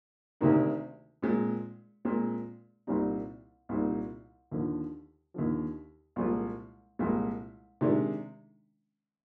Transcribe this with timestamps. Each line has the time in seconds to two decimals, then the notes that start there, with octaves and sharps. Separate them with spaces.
0.41 D2 C3 D#3 A#3 D#4
1.22 A#2 G#3 C4
2.05 A#2 G#3 C4
2.87 C2 A#2 G3 C4 D#4
3.69 C2 A#2 G3 C4 D#4
4.51 D#2 D3 F3
5.34 D#2 D3 F3
6.16 C2 A#2 F3 G#3
6.99 C2 A#2 F3 G#3
7.81 C3 D#3 G#3 D4